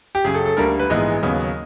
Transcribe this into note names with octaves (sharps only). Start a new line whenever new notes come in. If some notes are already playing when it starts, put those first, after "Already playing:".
G4
F#2 C#3 F#3 G#4
A4
A4
D2 D3 G3 A#3 A#4
B4
A#1 G#2 E3 G#3 B3 D#5
D#2 C#3 F#3 B3